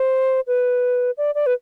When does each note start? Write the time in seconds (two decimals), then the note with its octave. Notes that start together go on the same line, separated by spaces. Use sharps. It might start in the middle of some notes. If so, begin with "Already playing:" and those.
Already playing: C5
0.48 B4
1.18 D5
1.35 D5
1.46 B4